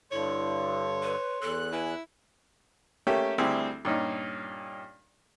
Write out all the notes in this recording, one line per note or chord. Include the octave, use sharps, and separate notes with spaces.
G2 D3 E4 C#5 C6
B4
E2 A4 F#6
E4 B4 G#5
A3 A#3 C#4 G4
D2 G3 C4 E4 G#4
G2 A#2 C#4 D#4